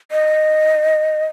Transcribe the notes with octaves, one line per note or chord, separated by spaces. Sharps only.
D#5